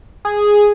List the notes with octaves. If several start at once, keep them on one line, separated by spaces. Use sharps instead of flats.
G#4